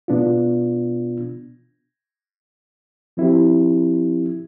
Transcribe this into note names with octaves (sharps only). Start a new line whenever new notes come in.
B2 B3 D4 F4
F3 C4 E4 G4